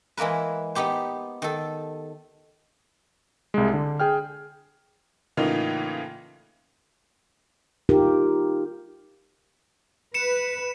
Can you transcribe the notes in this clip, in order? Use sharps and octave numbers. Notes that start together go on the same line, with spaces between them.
E3 G#3 A#3 A#4 B4
B3 D#4 G4 C5
D#3 A4
C2 G#3
D3
G#4 G5 F6
A2 C#3 E3 A#3 D#4 F4
D#4 F4 G4 A#4
B4 C#7 E7